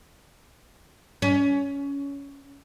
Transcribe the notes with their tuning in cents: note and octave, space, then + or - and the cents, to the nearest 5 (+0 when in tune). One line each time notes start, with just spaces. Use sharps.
C#4 +20